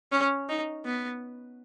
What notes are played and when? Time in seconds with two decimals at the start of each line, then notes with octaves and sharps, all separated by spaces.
0.12 C#4
0.49 D#4
0.85 B3